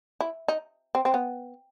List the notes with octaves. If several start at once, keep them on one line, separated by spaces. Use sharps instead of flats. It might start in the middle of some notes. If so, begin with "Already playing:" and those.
E4
D#4
C4
C4
B3